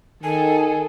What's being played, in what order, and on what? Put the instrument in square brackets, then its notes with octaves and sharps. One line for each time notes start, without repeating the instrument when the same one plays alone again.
[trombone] D#3 [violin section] G#4 A4 [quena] G#5